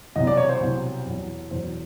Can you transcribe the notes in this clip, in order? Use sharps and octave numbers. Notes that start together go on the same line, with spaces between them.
C2 B2 F#3 D#5
D5
C#5
C5
C2 B2 F#3
E2 B2 F#3
E2 B2 F#3 C5